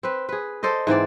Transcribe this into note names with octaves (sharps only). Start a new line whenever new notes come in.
C4 B4
G#4 B4
A4 C5 D5 D#5
G#2 E3 C4 D5